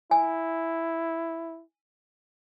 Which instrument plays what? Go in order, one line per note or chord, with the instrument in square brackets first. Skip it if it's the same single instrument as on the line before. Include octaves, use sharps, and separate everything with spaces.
[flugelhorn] E4 [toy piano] G#5